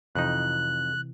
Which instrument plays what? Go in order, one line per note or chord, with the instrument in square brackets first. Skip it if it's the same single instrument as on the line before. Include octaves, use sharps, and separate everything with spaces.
[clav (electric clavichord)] F2 D#4 [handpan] C3 E3 C4 [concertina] F#6